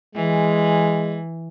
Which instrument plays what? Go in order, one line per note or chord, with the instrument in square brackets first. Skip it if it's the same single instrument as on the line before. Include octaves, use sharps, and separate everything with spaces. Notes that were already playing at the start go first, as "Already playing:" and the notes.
[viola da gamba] E3 [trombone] G#3